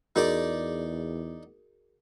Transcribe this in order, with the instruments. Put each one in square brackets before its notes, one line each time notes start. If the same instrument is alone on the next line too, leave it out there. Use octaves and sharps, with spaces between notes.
[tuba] E2 [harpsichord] D#4 D5 [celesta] F#4 G#4 A#4